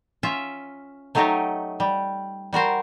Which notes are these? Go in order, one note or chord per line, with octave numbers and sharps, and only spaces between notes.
C#4 F4 E5
F#3 A3 D#4 G4 C#5 D#5
G3
G3 F#4 A#4 C5